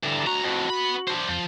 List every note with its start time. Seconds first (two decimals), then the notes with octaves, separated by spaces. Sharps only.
0.03 D3 E3 G3 A5 A#5
0.27 D2 F#4 A#5
0.43 F2 A2
0.70 B3 B5
1.08 D4 C5
1.29 F2 F3 G6